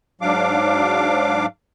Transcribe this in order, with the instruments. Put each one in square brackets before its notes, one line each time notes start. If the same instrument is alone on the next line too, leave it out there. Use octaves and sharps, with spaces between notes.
[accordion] G#2 F#3 D4 F5 D6